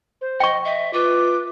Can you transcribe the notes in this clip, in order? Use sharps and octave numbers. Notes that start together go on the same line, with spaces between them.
C5
D#5 G5 C#6
D#5 E5
F4 B4 D6